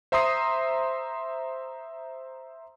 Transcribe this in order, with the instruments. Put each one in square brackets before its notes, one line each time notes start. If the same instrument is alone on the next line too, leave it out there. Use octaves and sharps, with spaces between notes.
[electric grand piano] C5 E5 A#5 C6 D#6 C7